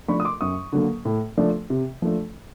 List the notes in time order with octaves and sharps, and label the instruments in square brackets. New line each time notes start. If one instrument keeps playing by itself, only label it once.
[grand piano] F3 A3 D4 B5 C#6
D#6
C6 D6
F#2 C#6 D#6
D3 F#3 A#3
A2
F3 A3 D4
C3
F3 A3 D4